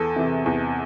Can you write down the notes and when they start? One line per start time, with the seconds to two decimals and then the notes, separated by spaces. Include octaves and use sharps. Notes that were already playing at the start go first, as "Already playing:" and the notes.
Already playing: E2 A4
0.16 C3 E3
0.46 E2